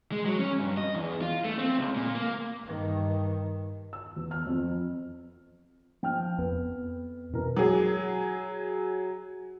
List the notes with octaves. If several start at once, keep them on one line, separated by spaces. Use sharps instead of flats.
G#3
F#3
C#4
G2
D#5
E2
F4
A3
C4
C#2
A#2
A#3
G2 D#3
E6
E2
F6
F2
F3 G5 F6
F2 B3
B2 E3 A#4
F#3 G#4